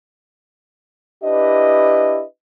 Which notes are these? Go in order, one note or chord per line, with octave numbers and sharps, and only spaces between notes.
D4 E4 G4 B4 D#5